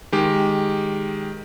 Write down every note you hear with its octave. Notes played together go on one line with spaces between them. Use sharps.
D#3 G#3 G4